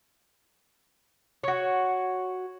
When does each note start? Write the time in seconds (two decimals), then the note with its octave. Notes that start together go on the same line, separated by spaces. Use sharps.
1.43 F#4 C#5